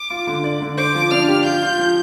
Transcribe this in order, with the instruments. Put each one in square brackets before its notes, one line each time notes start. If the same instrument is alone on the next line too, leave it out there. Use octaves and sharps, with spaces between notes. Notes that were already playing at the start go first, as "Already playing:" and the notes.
Already playing: [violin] D6
[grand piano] F4
D3
D5
D3
[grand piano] C5 [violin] D6
[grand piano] F3
[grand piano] D4 [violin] F6
[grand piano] G4
[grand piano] F4 [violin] G6
[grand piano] F4
F3